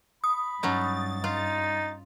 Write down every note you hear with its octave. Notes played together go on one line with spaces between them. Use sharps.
B5 D#6
G2 F#3 C#4 D#4 A6
D#4 F4